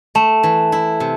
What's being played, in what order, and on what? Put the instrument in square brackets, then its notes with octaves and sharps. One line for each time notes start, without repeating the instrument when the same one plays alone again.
[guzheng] A3 [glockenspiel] A5
[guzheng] E3
E4
C3